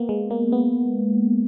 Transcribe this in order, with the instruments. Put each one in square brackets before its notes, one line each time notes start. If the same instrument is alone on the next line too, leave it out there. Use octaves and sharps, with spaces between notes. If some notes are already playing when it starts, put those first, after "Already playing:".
Already playing: [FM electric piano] A#3 B3
G#3
A#3
B3